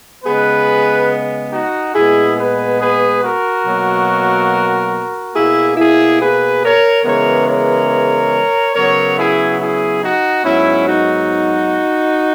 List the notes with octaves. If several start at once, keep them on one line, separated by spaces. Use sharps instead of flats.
C#3 G#3 B3 G#4 B4
D#4 F#4
A#2 G#3 B3 E4 G#4
G#4 B4
G#4 B4
F#4 A#4
B2 F#3 A#3
B2 A#3 E4 G#4
E4 G#4
G#4 B4
A#4 C#5
C#3 E3 G#3 B3 A#4 C#5
A#4 C#5
C#3 F#3 B3 A#4 C#5
E4 G#4
E4 G#4
D#4 F#4
G#2 F#3 B3 C#4 E4
D#4 F#4